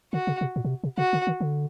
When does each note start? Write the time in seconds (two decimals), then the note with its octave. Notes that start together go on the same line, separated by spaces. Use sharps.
0.13 D3 F#4
0.27 C#3
0.41 C3
0.56 A#2
0.65 B2
0.70 C3
0.84 C3
0.98 C#3 F#4
1.13 D3
1.27 D#3
1.41 D3